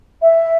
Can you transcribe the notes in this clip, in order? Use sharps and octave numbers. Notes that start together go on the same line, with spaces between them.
E5